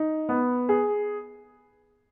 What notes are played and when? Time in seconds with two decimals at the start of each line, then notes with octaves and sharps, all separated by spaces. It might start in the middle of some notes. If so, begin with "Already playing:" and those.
Already playing: D#4
0.29 B3
0.69 G#4